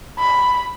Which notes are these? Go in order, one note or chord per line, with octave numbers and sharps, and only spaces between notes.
B5